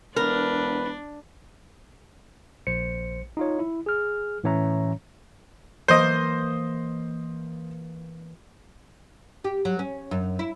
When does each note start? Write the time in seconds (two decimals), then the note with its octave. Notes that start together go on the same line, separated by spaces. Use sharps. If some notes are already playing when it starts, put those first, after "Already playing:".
0.16 E1 D4 A#4 B4
2.67 A#1 C5 C#7
3.37 D#4 F4 C#5
3.59 E4
3.86 G#4 F6
4.44 A2 E3 C#4 C#5 E5 A#5
5.88 E3 A#3 C5 D#5
9.44 G4
9.65 F#3
9.79 C#4
10.11 F#2
10.39 E4